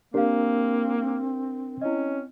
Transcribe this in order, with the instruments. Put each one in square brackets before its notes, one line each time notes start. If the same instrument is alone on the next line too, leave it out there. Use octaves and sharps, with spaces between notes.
[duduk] A#3 [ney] C4 [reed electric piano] D4 A#4 [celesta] G4 F5
[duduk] C#4 [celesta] E4 D#5